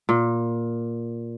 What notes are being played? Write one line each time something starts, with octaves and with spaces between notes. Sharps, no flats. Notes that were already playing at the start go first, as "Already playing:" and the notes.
A#2